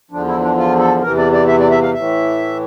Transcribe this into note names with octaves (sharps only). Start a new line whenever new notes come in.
E2 D3 F3 D4
E4
D4
F4
A4
E2 C3 E3 A#4
D5
D5
E5
D5
E5
F5
A2 E3 E5